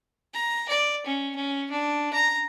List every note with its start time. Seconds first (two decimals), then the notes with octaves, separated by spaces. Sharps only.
0.34 A#5
0.68 D5
1.06 C#4
1.35 C#4
1.71 D4
2.13 A#5